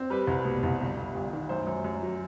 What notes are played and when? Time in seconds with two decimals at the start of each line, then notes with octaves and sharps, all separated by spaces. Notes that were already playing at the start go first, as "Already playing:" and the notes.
Already playing: C4
0.10 G3 B4
0.27 C2
0.45 B2
0.63 C2
0.80 G1
0.98 G2
1.14 G1
1.33 D#3
1.49 F#2 C5
1.67 F#2
1.84 F#2
2.03 F#3